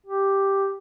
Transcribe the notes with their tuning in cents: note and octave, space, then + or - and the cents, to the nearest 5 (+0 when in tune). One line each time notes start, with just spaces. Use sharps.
G4 +0